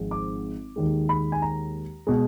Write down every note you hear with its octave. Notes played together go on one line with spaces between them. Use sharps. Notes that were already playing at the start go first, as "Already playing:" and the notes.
Already playing: G#1 G#2 F3 G#3
D6
D#2 D#3 G#3
B5
G#5
A#5
B2 G#3